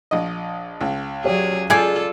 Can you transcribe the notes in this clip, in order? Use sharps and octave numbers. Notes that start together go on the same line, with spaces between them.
A#1 D#5
C#2
F#3 G4 G#4 C#5 D5
F4 G#4 A4 D5 G6 G#6 C7